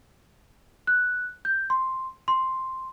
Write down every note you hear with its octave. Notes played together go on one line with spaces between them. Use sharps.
F#6
G6
C6
C6